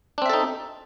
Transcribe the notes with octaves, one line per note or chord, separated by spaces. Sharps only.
C4 D4 D#4 A4 E5